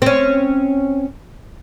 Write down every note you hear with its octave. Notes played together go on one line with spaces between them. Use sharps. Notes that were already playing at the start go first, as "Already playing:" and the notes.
C4 C#4